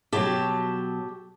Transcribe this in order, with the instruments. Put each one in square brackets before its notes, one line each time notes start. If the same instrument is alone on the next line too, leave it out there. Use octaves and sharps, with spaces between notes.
[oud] B2 F#3 [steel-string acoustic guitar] G4 A5